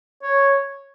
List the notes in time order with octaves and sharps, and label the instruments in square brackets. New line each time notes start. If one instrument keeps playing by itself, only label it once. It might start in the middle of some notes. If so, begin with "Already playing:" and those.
[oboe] C#5